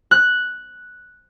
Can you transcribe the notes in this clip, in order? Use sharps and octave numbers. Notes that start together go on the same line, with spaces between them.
F#6